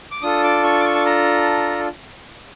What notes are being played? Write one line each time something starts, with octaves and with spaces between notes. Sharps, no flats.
D6
D4 F4 A4 D#6
D6
C#6
D6
C#6
A5
A#5